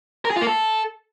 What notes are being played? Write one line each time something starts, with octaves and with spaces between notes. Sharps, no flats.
A#4
G#4
F4
A#3
A4